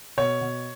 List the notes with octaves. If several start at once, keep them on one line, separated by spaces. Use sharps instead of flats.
B2 C#5
B2